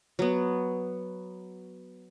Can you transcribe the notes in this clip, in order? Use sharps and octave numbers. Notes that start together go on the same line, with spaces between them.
F#3 B3